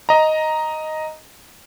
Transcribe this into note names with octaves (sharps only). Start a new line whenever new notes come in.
D#5 A#5